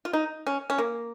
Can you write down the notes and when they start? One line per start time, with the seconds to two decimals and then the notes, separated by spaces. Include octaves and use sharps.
0.05 F4
0.13 D#4
0.47 C#4
0.70 C#4
0.78 A#3